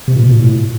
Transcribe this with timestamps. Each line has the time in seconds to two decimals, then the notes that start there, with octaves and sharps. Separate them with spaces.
0.08 C3
0.16 A#2
0.23 B2
0.31 A#2
0.39 A2